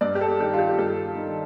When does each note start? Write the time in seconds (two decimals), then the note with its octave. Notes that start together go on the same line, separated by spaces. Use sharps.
0.01 G2 D5
0.15 G4
0.21 A4
0.40 D#3 G4
0.53 F4
0.58 G4
0.78 G2 A4
1.16 D#3